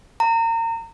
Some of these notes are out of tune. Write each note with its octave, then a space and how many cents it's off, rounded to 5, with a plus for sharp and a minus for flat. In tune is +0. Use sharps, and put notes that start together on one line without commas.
A#5 -30